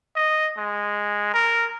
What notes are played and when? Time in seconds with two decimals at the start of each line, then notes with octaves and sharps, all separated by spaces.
0.16 D#5
0.58 G#3
1.34 A#4